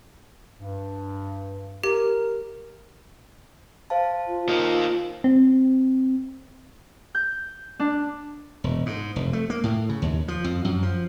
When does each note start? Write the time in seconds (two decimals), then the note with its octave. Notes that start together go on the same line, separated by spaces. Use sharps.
0.59 G2
1.84 G4 A#4
3.90 C5 F5 A5
4.27 F4
4.49 A#3 D#4
5.24 C4
7.15 G6
7.80 D4
8.64 E1
8.86 G#2
9.16 F1
9.33 A3
9.50 A#3
9.64 A2
9.89 C#3
10.02 D#2
10.28 F3
10.44 F2
10.64 F#2
10.83 F3